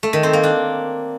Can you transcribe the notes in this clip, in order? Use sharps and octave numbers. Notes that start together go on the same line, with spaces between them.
A3
D#3
C4
A#3
D4